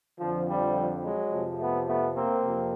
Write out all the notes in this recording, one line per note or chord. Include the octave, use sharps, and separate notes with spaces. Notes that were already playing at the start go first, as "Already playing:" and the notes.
F2 D3 F3
F3 G3
F#3 G#3
F2 C3 F3
A3 B3
A3 B3
A#3 C4
F2 C3